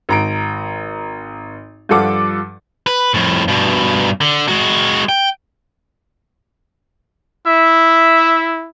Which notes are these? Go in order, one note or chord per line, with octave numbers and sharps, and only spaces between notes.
G#1 A#5 D7
G2 F3 F4 A4 F#5 D6
B4
F2 A2
G2 B2
D3
G#3 F#4
G5
E4 E5